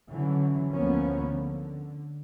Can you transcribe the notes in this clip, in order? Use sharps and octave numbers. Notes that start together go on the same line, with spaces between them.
D3 E3 F#3 C#4
D2 E3 F3 A#3 B3 C#4
D3